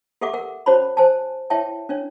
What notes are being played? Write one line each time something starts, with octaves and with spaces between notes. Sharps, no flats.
G4 A4 E5 F#5 D6
A#4 F#5
C#4 F#4 C5 C#5 A5 B5
C5 G#5 A5
E4 C#5 E5 G5 A5
C#4 D4 C#5